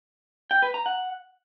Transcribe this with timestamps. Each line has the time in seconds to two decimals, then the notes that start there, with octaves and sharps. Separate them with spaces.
0.51 G5
0.62 B4
0.74 A#5
0.86 F#5